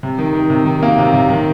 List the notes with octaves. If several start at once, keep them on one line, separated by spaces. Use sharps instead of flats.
C3
D#3
D#3
C3
D#3
A#3
C3
C3
D#3